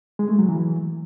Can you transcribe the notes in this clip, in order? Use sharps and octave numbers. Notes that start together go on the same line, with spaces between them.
G#3
A3
F#3
E3